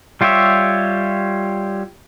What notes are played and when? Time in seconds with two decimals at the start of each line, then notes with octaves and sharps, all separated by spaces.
0.21 G3 F4 G4 C#5 E5